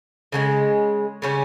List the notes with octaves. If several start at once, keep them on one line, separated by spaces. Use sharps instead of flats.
C#3 F3 G#3
C#3 G3 C#4